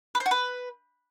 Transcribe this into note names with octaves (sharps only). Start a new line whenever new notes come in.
B4
C5
F#4
B4